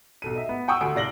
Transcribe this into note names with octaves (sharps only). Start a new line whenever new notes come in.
B1 A4 D#7
D#5 E5
B3
F#5 G5 C#6 D#6 E6
D2 G#5 D7
C2 F4 D5 A#6 F#7 G7